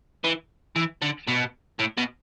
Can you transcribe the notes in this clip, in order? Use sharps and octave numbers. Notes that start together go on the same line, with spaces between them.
E3
E3
D3
B2
A2
B2